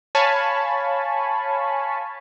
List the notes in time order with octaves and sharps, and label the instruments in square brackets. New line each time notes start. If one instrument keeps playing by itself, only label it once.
[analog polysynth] C#5 F5 G#5 A5 B5 C#6